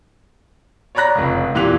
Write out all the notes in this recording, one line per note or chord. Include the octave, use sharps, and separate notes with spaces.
C#5 D5 A#5 B5 F#6 A#6
F1 C#2
E2 A#2 E3 G4 F#6 F7